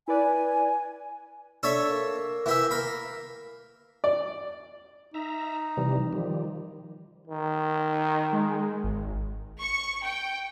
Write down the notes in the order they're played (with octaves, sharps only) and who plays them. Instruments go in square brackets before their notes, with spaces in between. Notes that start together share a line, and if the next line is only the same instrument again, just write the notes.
[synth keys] E4 B4 D5 [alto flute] G#5
[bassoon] D4 [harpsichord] A4 C#5 E5
[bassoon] A#3
[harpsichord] E3 G4 E5
A#4 B5
[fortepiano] D5
[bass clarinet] D#4 [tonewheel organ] E5 A#5
[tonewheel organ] C3 E3 G3
D#3 F3 G3
[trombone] D#3
[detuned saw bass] G#3
G#1
[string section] C#6
G5